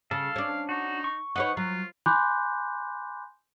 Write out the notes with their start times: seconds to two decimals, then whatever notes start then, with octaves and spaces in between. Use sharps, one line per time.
0.11 C#3 A4 F5
0.36 C#4 D4
0.69 D#4 F#4
1.04 C#6
1.36 D#4 B4 C#5 F#5
1.57 F#3 F4
2.06 G#5 B5 C6 D6 F#6 G6